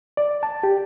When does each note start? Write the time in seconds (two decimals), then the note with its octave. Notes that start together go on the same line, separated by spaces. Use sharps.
0.17 D5
0.43 A5
0.63 G4